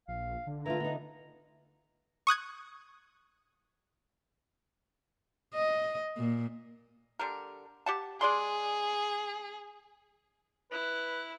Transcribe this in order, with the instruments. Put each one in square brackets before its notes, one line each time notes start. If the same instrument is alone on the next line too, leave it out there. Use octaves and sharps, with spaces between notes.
[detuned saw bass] A#1 [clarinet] F5
[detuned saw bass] D3
[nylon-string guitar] E3 A3 F4 [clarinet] A#5
[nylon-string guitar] B3 D#4
[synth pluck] C#6 D#6 F#6 G#6
[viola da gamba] D#5
A#2
[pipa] D3 G3 A#4
G4 F#5 A5
[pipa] G#3 D5 C6 [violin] G#4
[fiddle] E4 [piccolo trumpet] B4 [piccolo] F#6